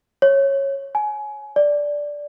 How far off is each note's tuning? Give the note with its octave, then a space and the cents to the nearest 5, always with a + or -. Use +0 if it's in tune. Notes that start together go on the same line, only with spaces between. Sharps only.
C#5 -15
G#5 +25
D5 -5